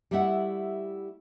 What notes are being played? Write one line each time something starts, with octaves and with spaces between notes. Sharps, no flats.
G3 A3 E4 E5 F#5